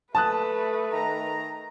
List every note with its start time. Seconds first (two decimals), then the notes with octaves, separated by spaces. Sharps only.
0.15 A3 B4 A5 D#6 F#6
0.92 D#3 A#5